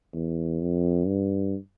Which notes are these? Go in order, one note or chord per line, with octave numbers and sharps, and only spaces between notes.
E2
F2
G2